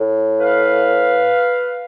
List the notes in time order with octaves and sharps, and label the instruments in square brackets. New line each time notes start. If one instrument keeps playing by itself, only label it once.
[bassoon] A2
[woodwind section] B4 F5